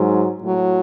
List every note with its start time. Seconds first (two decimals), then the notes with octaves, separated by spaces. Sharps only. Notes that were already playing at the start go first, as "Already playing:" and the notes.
Already playing: G#2 F#3
0.42 A2 F#3